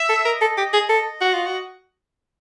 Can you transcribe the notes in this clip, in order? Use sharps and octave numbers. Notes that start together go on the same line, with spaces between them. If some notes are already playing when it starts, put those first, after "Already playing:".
Already playing: E5
A4
A#4 D#5
A4
G4
G#4
A4
F#4
F4
F#4